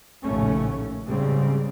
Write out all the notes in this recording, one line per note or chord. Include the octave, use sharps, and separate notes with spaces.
A#1 D#2 A2 C#3 A3 C#4
G#2 C#3 G3 C4